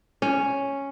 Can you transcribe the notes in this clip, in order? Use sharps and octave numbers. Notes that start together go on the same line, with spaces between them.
C#4